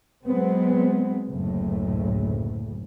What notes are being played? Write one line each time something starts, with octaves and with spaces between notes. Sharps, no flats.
F#3 G#3 B3 C4
F#1 D2 A2